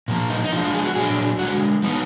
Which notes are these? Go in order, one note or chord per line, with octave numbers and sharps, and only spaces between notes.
A#2 F3 A#3
D#4
D#4
F3 G#3 D4 F4
F4
G#4
F#4
A#2 F#3 D4 G#4
D3 F3 G#3 F#4
F3 B3 D#4